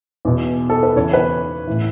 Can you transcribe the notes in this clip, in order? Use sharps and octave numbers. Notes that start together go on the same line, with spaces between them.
E2 B2
A4
B4
E2 C#3 E3 C#5
B4
A2 E3